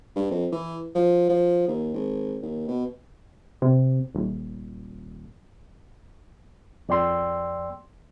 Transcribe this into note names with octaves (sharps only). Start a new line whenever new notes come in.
G2
F2
E3
F3
F3
D#2
G#1
D#2
B2
C3
D#1
F2 D5 G5 C6 E6